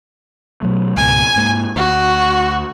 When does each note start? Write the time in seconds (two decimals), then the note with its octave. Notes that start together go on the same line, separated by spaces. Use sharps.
0.62 B2 F#3 A3
0.97 C#2 G#2 B2 G#5
1.36 G#2 A#3
1.76 D2 F#4